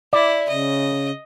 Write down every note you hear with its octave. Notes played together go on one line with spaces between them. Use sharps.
E4 D5
C#3 D#5